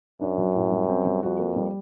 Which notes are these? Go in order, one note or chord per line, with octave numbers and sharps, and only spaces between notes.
F#2 D4
F#3
A2
G3
C4
G3
F2 F#4
A#3
G3